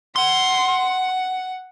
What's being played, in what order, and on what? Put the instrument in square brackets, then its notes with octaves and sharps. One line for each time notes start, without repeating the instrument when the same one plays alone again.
[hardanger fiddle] F#5 [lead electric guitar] C6